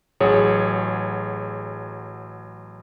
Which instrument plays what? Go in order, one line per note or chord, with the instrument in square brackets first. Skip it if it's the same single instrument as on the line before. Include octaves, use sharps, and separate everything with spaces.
[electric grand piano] A1 F#3 G#4 C#5